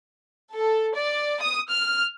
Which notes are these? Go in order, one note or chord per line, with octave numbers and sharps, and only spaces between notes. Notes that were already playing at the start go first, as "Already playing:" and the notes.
A4
D5
D#6
F6